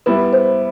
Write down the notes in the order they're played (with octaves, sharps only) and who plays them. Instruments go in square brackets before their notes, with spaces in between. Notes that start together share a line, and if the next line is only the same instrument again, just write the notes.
[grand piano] G3 B3 E4 [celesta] B4
[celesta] C5